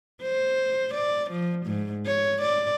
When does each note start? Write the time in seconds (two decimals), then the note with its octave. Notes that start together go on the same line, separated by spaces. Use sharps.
0.22 C5
0.94 D5
1.31 F3
1.66 G#2
2.06 C#5
2.42 D5